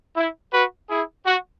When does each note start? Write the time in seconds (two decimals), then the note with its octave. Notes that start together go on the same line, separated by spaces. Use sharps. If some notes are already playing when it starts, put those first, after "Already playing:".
0.16 E4
0.53 F#4 B4
0.90 E4 G#4
1.25 F#4